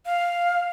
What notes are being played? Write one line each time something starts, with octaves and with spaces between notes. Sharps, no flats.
F5